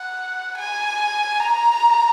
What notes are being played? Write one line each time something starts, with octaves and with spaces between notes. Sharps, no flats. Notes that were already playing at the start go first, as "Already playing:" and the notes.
Already playing: F#5
G#5
A#5